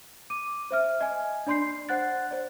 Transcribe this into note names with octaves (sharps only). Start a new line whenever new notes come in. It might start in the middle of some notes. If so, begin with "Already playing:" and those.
D6 D#7
C5 E5 F6
D#5 G#5
D4 D5 B5 C6 G6 C7
C5 F#5 F#6 A6
C5 D5